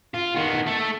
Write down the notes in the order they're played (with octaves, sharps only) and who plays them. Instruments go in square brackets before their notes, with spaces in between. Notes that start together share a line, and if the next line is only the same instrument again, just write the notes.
[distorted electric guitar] F4
D#3 B3
A3 A4